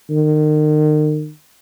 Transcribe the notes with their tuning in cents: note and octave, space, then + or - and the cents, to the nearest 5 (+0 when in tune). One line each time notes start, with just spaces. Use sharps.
D#3 -35